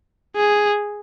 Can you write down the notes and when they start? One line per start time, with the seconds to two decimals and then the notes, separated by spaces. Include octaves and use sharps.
0.36 G#4